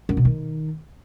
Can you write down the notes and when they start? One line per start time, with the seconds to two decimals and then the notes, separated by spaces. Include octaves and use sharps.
0.09 F#2
0.17 B2
0.25 D#3